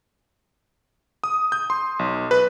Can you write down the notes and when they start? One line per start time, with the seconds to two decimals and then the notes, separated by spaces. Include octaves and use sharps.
1.24 D#6
1.52 G6
1.70 C6
1.99 B1
2.31 B4